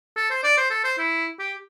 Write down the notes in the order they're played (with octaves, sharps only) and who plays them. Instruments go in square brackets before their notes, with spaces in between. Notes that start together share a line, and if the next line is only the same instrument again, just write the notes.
[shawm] A4
C5
D5
C5
A4
C5
E4
G4